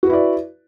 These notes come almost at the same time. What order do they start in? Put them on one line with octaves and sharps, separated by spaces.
F#4 B4 E4 D5